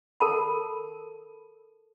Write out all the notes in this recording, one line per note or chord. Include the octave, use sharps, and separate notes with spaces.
A4 A#4 A5 B5